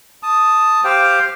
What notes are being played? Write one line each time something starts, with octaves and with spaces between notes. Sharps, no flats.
A5 D#6
G4 C5 F5 G5